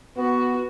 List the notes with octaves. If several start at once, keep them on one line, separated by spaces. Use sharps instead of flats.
B3 F#4